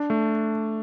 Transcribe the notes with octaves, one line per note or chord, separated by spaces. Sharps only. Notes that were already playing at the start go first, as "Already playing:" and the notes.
Already playing: D4
A3